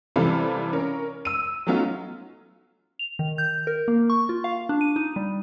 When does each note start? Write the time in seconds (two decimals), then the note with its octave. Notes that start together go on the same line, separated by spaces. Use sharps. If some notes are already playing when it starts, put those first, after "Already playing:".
0.16 C3 E3 G3 A4 F5 B5
0.73 C#4 A#4
1.25 E6 D#7
1.67 F#3 A3 B3 C#4 D#4 F4
2.99 F7
3.19 D#3
3.38 G6
3.67 A#4
3.88 A#3
4.10 C#6
4.29 F4
4.44 F5
4.69 D4
4.81 D#7
4.96 D#4
5.16 G3